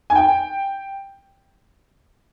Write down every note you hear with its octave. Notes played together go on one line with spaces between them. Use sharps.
G#5
G5